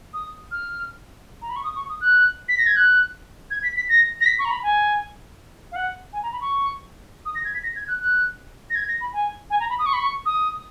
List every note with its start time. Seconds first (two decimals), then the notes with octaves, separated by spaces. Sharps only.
0.14 D#6
0.51 F6
1.42 A#5
1.50 B5
1.56 C#6
1.64 D#6
1.76 C#6
1.89 D#6
2.01 F#6
2.49 B6
2.58 A#6
2.67 G#6
2.76 F#6
3.51 G#6
3.63 B6
3.76 B6
3.89 A#6
4.21 A#6
4.26 B6
4.39 C#6
4.45 A#5
4.51 B5
4.63 G#5
5.72 F5
5.76 F#5
6.13 G#5
6.23 A#5
6.32 B5
6.41 C#6
7.26 D#6
7.35 A#6
7.45 G#6
7.54 B6
7.63 A#6
7.76 G#6
7.88 F#6
8.00 F#6
8.70 A#6
8.75 G#6
8.88 A#6
9.01 B5
9.13 G#5
9.50 G#5
9.60 A#5
9.70 B5
9.79 D#6
9.86 C#6
9.93 B5
10.00 C#6
10.26 D#6